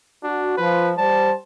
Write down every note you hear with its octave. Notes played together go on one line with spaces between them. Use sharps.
D4 F#4
F3 B4
G3 C5 A5